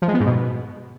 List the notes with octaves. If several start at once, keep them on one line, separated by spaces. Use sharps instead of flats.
F3
G#3
B3
G#2
B2